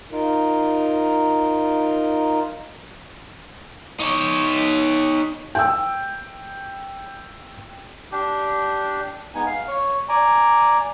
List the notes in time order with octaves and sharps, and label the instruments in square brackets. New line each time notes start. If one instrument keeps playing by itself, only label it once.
[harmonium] D#4 F4 A#4
[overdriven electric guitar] D#4 C#5
[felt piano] G5 E6
[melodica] D4 G4
[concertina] G#3 B3 D#4 G#5
F5
C#5
D5 G#5 A#5